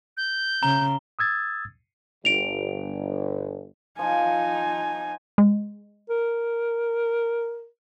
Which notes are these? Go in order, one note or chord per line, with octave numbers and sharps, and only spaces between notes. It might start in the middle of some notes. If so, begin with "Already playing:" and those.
G6
C#3 A#5 G7
D#6 E6 G#6 A6
G1 D7 F7
F3 D#4 G#5
G#3
A#4